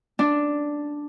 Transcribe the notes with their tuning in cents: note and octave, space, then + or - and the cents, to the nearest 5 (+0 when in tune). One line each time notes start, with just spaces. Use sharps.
D4 +0